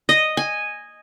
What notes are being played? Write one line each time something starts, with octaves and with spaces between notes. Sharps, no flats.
D#5
G#5